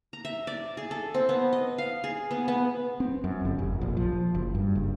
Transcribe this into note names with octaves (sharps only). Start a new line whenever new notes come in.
A#5
E5
D5
G#4
A4
C4
B3
D#5
F5
G#4
B3
B3
C4
F#2
G1
F1
A#1
F3
F#1
G2
F#1